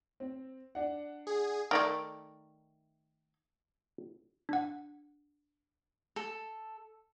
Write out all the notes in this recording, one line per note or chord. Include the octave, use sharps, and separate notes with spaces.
C4
D4 F#5
G#4
D#3 A3 A#4 D5
D4 F#5
A4